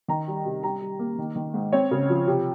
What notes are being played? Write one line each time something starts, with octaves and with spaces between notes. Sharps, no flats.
D#3 A#5
G3
C3
G3 A#5
G3
A#3
D#3
D#3
G#2
C4 C#5
C#3
F3
C3